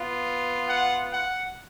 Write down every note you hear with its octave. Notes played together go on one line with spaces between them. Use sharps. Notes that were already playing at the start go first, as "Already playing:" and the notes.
Already playing: B3 F4
F#5
F#5